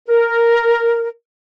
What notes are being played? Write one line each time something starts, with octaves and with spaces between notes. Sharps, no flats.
A#4